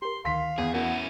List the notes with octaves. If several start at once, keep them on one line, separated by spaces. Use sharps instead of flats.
G4 A#4 C6
D2 D#3 F5 C6 B6
E2 G#4
C#4 E4 F#4 A#4 G#5